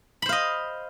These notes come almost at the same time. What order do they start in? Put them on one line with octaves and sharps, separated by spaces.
B5 C5 F5 D#5